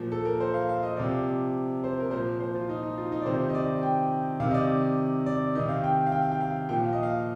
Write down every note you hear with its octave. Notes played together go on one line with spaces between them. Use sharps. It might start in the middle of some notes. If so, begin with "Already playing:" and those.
Already playing: A#2 F3
A4
A#4
C5
F5
F5
D#5
C3 F3 D5
C5
A#4
A#2 F3 C5
C5
F4
D#4
D#4
F4
D#4
D5
C3 D#3 C5
D#5
D5
G5
C3 D#3 F5
D#5
D5
D5
C3 D#3 D#5
F5
G5
F5
G5
F5
G5
F5
A#2 F3 G5
F5
D#5
F5